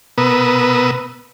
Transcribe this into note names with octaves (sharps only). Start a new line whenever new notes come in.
B2 B3 A#4 B4 D#6 E6